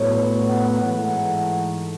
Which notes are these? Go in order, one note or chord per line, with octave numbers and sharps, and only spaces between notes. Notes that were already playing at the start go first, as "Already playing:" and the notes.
Already playing: A2 F#3 B3 C#5
F#5
G#2 E3 A3 D#4 F#5